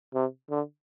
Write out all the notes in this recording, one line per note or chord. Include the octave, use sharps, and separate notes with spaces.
C3
D3